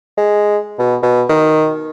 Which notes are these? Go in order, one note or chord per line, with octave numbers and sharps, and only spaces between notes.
G#3
B2
B2
D#3